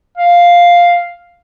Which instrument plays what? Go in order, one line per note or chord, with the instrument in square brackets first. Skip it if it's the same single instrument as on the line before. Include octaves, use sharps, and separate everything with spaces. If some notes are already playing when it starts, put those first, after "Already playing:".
[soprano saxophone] F5